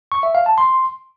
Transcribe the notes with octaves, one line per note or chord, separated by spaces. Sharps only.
C#6
E5
F5
A5
C6